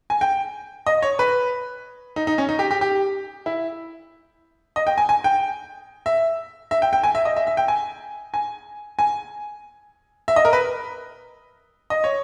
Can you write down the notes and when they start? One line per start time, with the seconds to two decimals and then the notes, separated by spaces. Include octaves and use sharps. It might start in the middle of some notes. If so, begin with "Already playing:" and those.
0.10 G#5
0.21 G5
0.86 D#5
1.02 C#5
1.19 B4
2.16 D#4
2.27 D#4
2.38 C#4
2.49 D#4
2.59 G4
2.71 G4
2.81 G4
3.46 E4
4.76 D#5
4.87 G5
4.98 G#5
5.09 G#5
5.24 G5
6.06 E5
6.71 E5
6.82 G5
6.93 G5
7.04 G#5
7.15 E5
7.25 D#5
7.36 E5
7.47 E5
7.57 G5
7.68 G#5
8.34 G#5
8.99 G#5
10.28 E5
10.36 D#5
10.45 A#4
10.53 B4
11.90 D#5
12.04 C#5